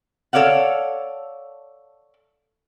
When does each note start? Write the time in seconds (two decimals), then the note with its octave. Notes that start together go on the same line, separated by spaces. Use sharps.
0.33 A4 C#5 D5 F5 F#5